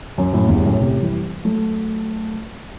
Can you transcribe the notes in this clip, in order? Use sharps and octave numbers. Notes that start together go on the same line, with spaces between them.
F#2
F#2 A2
E2 G2
F#2 A2
A2 C3
E3 G3
F#3 A3